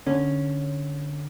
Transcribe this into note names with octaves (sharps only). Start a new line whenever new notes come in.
D3 C#4